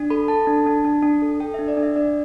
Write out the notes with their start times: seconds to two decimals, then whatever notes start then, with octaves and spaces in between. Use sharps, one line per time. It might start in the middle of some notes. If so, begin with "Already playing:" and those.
Already playing: D4
0.10 A4 B5
0.28 A4 A5
0.47 D4
0.66 D4
0.85 D4
1.03 D4
1.22 A4
1.40 A4 G5
1.54 D4 E5
1.68 D5
1.77 D4
1.83 E5
1.96 D4 D5